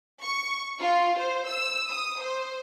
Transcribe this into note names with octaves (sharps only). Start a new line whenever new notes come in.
C#6
F4
C5
E6
D#6
C5